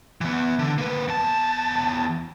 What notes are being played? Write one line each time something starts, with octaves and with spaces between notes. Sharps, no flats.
E3 B3
D3
A#3 B4
E2 A5